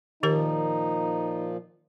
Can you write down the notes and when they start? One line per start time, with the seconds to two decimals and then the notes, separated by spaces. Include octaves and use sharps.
0.23 A#2 D#3 F3 D#4 G4 A#4